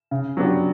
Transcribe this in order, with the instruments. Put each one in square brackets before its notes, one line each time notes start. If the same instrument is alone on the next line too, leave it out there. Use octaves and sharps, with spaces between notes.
[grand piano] C#3
F#3 B3 D4 G4